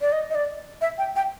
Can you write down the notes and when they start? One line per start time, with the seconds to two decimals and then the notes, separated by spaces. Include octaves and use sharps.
0.01 D5
0.12 D#5
0.30 D#5
0.35 D5
0.81 E5
0.98 G5
1.16 G5